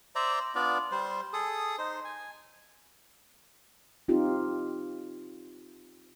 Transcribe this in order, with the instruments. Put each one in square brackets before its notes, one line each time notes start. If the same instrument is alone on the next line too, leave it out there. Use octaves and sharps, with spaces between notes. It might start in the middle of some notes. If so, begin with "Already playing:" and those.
[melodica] C5 D5 E5 A#5
B3 D4 F4 D5
G3 C5
G#4 A4 D#6
D#4 C5
G#5
[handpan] C4 D#4 F4 G4